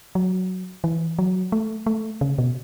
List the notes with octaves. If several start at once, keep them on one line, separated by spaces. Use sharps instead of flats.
F#3
E3
F#3
A3
A3
C#3
B2